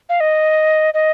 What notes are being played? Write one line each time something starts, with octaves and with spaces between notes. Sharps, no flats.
F5
D#5
D#5